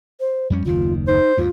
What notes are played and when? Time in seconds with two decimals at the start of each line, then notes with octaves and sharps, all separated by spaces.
0.20 C5
0.50 F2 G3 C#4
0.65 F#1 D#2 D#3 F4
1.07 D#4 C5
1.37 D2 G2 F4